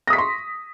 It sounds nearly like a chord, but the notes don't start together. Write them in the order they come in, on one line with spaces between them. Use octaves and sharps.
A#6 D#6 B6 C#6 C6